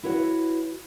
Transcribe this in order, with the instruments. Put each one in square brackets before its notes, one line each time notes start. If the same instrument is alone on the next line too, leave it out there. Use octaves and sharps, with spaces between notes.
[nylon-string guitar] E4 F#4 B4 C#5 F#5